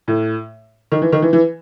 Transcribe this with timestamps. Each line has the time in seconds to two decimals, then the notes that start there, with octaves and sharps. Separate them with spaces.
0.08 A2
0.92 D#3
1.02 E3
1.12 D#3
1.22 E3
1.33 E3